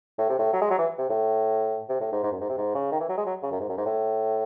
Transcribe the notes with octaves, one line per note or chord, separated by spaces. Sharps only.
A2
C3
A2
F#3
G#3
F#3
E3
C3
A2
C3
A2
G#2
G#2
F#2
G#2
C3
G#2
C#3
D#3
E3
F#3
G#3
F#3
C#3
F#2
G#2
F#2
G#2
A2